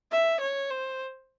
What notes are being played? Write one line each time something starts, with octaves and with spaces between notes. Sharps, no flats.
E5
C#5
C5